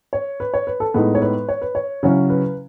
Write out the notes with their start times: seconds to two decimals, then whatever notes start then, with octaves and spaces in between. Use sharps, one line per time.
0.13 C#5
0.40 B4
0.54 C#5
0.67 B4
0.80 A4
0.94 A2 G#3 B3 D#4 B4
1.15 C#5
1.22 B4
1.49 C#5
1.62 B4
1.75 C#5
2.03 C#3 F#3 C#4 E4
2.30 B4